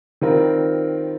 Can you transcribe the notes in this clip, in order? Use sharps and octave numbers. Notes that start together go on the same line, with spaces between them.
D#3 G3 C4 F4 A#4